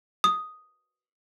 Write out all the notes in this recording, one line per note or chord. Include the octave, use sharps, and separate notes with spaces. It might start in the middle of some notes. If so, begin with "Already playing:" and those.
D#6